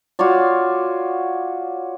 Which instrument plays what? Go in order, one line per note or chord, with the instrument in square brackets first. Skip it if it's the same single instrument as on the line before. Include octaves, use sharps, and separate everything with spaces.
[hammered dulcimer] F4 F#4 C#5 D5